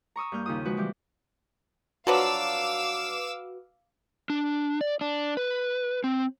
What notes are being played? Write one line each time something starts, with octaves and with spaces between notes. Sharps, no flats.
A#5 C#6 D#6 E6
G2 A#3 F6 G6
D#2 C#3 D#4 F4 D#6
F3 G#3 F#4 B4
E3 G3 G4
F3 F#3 D4 F#4 B4 F5 D6 E6
D4
D5
D4
B4
C4